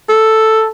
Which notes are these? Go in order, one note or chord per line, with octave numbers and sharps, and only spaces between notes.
A4